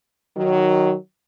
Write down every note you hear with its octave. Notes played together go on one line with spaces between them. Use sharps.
D#3 F#3